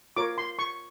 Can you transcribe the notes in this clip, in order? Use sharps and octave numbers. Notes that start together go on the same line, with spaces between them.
F4 A#4 C#5 D6
C6
C#6